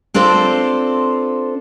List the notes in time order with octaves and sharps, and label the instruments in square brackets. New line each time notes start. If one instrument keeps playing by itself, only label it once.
[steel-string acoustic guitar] C4 D4 F4 A4 C5